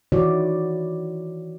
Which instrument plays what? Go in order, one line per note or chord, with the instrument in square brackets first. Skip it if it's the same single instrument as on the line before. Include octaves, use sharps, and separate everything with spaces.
[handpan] D#3 E3 E4 F#4 C#5 D5